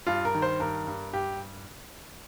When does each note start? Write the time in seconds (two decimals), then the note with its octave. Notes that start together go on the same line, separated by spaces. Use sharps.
0.07 G2 F4
0.25 A#4
0.34 D#3
0.42 C5
0.60 G2 A#4
0.87 G2
1.13 G2 G4